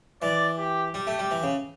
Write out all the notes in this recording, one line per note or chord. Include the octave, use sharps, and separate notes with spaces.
E3 D5
G4
G3 G4
A3
G3
E3
C#3